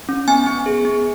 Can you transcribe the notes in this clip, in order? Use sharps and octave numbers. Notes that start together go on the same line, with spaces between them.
C#4
B3 G#5
B3
G#4
B3